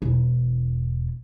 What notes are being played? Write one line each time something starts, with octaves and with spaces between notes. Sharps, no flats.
E1 E4